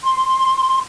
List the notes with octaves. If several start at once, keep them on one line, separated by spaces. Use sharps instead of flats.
C6